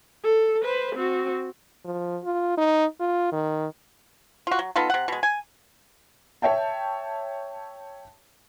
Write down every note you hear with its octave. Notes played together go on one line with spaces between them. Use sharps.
A4
B4 C5
C4 F#4
F3
F4
D#4
F4
D#3
F4 F#4
F#3
B3 D#4 F4 A4
C3 F#5
B2 G#3
G#5
C#5 E5 G5 A5